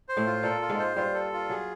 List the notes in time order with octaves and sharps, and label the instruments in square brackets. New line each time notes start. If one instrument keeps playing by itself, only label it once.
[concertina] C5
[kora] A2 A3
[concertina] F4
[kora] A#2 A#3 [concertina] A4
[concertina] F4
[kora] G#2 G#3
[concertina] C5
[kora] G2 G3 [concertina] F4
[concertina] A4
F4
[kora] F#3 [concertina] G#4